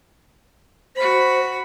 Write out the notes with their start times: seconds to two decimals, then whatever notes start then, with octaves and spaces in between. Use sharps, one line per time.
0.96 F#4 C5 B5